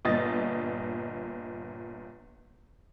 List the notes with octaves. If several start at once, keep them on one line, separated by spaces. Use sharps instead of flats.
G1 A#2 D#5 A6